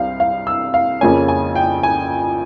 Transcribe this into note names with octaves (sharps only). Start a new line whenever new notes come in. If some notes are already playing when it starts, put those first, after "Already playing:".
Already playing: C2 G3 C4 F5
F5
E6
F5
F2 C#3 F3 A#3 C#4 G#5
G#5
G5
G#5